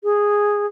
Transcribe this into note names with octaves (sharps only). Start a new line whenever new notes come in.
G#4